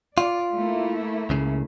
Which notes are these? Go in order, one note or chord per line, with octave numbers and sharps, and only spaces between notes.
F4 D5
A3 A#3 E4
C#2 C#3